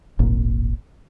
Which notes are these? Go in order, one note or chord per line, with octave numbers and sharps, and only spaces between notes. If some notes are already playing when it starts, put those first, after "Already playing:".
D1 G#1 A#2